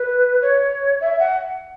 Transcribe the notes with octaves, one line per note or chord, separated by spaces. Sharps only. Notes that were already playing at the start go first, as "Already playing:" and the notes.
Already playing: B4
C#5
E5
F#5